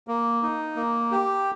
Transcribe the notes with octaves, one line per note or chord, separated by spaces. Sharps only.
A#3
D#4
A#3
G4